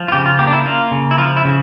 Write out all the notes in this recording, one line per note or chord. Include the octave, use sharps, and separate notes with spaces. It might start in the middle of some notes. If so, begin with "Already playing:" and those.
Already playing: F3
F4
C#3 G4
F4
A#3 G4
D4
E4
A#3 F4
C#3
E4
F3 F4
E4
C#3